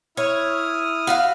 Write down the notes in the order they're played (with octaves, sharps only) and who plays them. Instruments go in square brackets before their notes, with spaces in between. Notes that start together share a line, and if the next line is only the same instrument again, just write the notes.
[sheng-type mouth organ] E4 D#6 F6 [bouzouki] C#5
[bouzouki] F#4 E5 F5